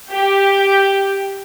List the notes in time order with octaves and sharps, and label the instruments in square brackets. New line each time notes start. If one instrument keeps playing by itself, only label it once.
[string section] G4